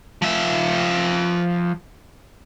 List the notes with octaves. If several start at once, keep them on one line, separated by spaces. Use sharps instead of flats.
F3 E5